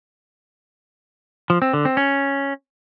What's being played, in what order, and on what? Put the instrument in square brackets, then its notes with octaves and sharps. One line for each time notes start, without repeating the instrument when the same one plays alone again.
[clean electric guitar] F3
C4
D3
C4
C#4